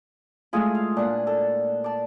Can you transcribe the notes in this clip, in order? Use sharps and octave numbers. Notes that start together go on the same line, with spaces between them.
G#3 A3 E4 F4 G#4
F5
A#2 D4 F#5
A4
D5 A5